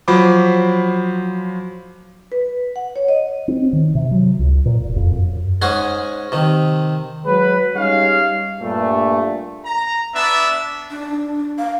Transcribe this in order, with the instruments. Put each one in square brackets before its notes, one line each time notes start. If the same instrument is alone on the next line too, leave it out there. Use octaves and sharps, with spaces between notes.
[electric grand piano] F3 F#3 C5 B5 D6
[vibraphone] B4
F#5
C#5
D#5
[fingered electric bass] C4
D#3
C3
F#3
C#2
A#2
E1
F2
F#2
[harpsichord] G#2 G#3 C#4 F#5 C6
C3 D#3
[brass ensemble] F#3 G#3 B4
G3 G#3 C#4 D#4 C#5 F5
G2 A#2 A3
[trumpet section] A#5
B3 D4 E5
[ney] D4
F5